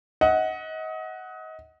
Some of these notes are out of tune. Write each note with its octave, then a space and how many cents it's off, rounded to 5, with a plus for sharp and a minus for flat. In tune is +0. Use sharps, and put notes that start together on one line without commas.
D#5 +30 F#5 +0